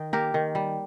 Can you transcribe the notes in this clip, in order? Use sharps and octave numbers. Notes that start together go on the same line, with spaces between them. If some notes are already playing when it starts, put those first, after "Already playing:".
Already playing: D#3 D#5 G5
A#3 G4 A#4
D#3
G3